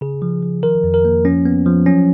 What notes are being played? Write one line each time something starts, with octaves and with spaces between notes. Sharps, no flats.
C#3 G#4
F3
F3
D#3 A#4
F2
A#4
A#3
F3 C#4
B3
F3
F#3 C#4